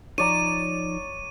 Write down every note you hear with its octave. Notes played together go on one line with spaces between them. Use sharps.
F3 D#4 C#5 D5 A#5 D#7